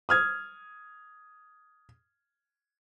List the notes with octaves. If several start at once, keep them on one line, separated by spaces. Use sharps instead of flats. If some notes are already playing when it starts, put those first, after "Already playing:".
D#6 F6 G#6